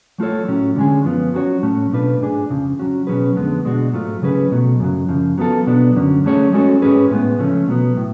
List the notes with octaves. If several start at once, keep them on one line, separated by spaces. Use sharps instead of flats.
F#3 A3 F4 A4 C#5
A2 F#3 C#4
D3 G#3 C#4 G#4
F#2 F3 B3 F4
F#3 C#4 F#4 A4 C#5
A2 F#3 A3 C#4
B2 A3 D4 F4 B4
G#2 G#3 D4 G#4
F2 C#3 F3
F#3 C#4 F#4
B2 F#3 C#4 G#4 B4
F2 D3 G#3 B3
B2 G#3 D4 F#4
G#2 F#3 A3 F4
C#3 F#3 C#4 G#4 B4
B2 F#3 A3
F#2 C#3 F#3
F#2 C#3 F3
F#3 B3 F4 A4
B2 F#3 B3 D4
F#2 D3 F#3 C#4
F#3 A3 C#4 G#4 C#5
G#3 C#4 F#4 A4 C#5
G#2 G#3 C#4 G#4 B4
A2 G#3 B3
C#3 F3 A3 C#4
B2 F#3 B3
A2